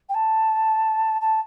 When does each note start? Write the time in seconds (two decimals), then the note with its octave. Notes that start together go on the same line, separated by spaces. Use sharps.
0.09 G5
0.14 A5
1.21 A5